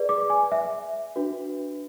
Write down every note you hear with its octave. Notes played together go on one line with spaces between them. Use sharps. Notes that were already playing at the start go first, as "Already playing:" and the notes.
Already playing: G#4 B4 D5
D6
G#5
E5
D4 F#4 B4